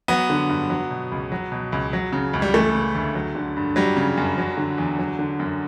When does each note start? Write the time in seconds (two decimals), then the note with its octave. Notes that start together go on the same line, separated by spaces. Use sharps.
0.08 F#3 B3
0.30 D3
0.49 G2
0.70 F#3
0.90 B2
1.12 C#2
1.32 F#3
1.52 B2
1.72 C#2
1.93 F#3
2.13 C#3
2.33 C#2
2.42 G3
2.54 E3 A3
2.75 C#3
2.95 D2
3.15 F#3
3.35 D3
3.56 G2
3.76 F#3 G3
3.97 C#3
4.17 F#2
4.38 F#3
4.57 D3
4.78 E2
4.99 F#3
5.19 D3
5.40 F#2